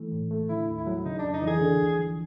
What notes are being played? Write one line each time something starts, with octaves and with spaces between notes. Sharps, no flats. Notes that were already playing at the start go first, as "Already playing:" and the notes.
Already playing: E3 A3
A2
A3
D3 E4
D#2
E4
F#3
C#3 D#4
D4
F2
D#4
E3
G#4
D3
D2
F3